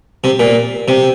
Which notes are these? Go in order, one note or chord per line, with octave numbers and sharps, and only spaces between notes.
C3
A#2
C3